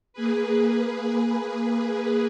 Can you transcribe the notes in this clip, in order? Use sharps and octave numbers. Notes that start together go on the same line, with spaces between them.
A#3 G#4 B4